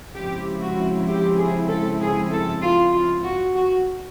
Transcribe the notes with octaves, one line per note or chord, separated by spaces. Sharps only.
C#3 F3 G#3 C4 E4 G4
F#4
G4
G#4
A4
G#4
A4
F4
F4
F#4
F#4